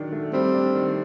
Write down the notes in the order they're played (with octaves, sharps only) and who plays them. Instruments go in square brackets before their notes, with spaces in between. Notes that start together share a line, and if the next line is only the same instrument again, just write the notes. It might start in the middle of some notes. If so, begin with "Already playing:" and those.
Already playing: [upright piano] D#3 F#3 D4
A3
[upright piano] G3 [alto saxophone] C4
[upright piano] D4
D#3